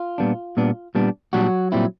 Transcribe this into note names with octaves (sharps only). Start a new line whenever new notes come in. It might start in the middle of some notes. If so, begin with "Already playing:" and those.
Already playing: F4
A#2 G3 B3 D4
A#2 G3 B3 D4
A#2 G3 B3 D4
A#2 F#3 G3 B3 D4 F#4
A#2 G3 C4 E4